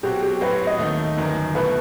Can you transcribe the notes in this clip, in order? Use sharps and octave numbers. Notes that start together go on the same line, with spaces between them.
B2 F#3 C4 F#4 G4
G4
A2 F#3 C4 F#4 B4
D#5
D#2 D#3 A3 D#4
G1 F#2 D#3
B2 A3 E4 B4